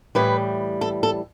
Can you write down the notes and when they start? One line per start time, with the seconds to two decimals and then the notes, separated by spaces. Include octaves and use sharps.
0.15 A2 E3 G3 B4
0.81 A4
1.03 A4